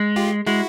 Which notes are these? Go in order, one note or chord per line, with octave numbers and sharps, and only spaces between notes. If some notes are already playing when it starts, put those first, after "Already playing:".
Already playing: G#3
F4 G4
G#3 E4 F#4